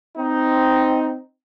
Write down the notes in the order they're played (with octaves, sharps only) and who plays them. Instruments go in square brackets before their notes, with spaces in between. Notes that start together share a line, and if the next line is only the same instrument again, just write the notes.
[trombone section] C4 D#4